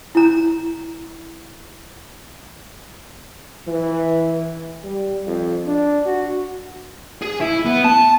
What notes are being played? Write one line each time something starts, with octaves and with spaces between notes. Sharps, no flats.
E4 A#5
E3
G3
F2
D4
F#4
G#4
E4
B3
A5